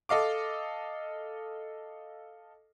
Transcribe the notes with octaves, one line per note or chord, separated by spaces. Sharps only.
A4 D#5 F5 D6